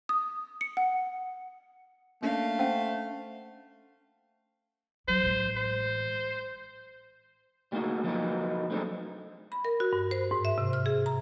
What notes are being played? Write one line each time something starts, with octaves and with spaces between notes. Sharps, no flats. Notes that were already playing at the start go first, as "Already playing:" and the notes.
D#6
C#7
F#5
A3 A#3 C#4 D4 F5
C#4 C5 E5 F#5
F#2 F#3 C5
A1 G#3
C5
G3 A3 A#3 D#4 F#4 G#4
F3 F#3 A#3 D#4 F4 B4
A3 C4 D4 D#4 G#4
B5
A#4
F#4
G2
C5
G#2
E5
C3
F6
G#4
A#5